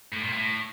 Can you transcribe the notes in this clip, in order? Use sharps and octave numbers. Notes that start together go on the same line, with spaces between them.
A2
A#2
A2